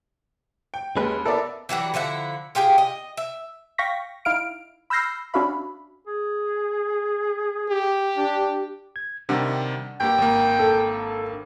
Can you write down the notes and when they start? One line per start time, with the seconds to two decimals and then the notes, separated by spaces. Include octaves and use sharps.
0.74 G5
0.97 D#2 G#3 C#4 B4
1.26 B3 E4 A4 A#4 D5 E5
1.69 E3 F#3 G3 F#4
1.94 D3 F3 E4 F#5
2.55 F4 G4 G#4 G5
2.78 D#5
3.17 E5
3.78 F5 G5 C#6 A#6 B6
4.25 D#4 E4 F5 F6 D7
4.90 B5 E6 F6 G6 A#6 C7
5.34 C#4 D4 F#4 E5 F5 B5
6.07 G#4
7.69 G4
8.17 D4
8.96 G#6
9.29 C3 D#3 G3 D4 F#5
10.00 G2 A#3 G4 G5
10.18 G#1 A#3
10.59 A4